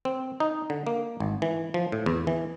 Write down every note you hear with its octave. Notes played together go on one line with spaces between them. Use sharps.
C4
D#4
D3
A#3
G#1
E3
F3
A2
E2
E3